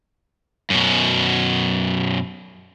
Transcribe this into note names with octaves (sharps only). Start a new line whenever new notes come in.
F#2 B2